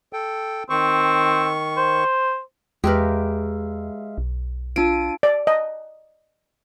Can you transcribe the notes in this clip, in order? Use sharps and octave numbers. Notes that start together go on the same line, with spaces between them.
A4 G5
D#3 C4 C#6
C5
E2 G#3 G4 A#4 B4 E5 F5
B1
D4 F4 D7 D#7
D5
D#5